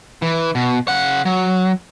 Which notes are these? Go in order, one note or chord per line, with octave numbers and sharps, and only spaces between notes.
E3
B2
C#3 F#5
F#3